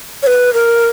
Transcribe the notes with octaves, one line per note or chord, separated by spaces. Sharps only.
C#5
B4
A#4